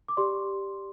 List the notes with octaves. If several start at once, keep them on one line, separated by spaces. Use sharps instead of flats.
D6
G4 D5 C6